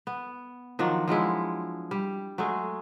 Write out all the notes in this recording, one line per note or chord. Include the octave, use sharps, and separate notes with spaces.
B3
D#3 F3 F#3 D4
F3 F#3 G#3 E4
G3
F#3 G#3 A3 G#4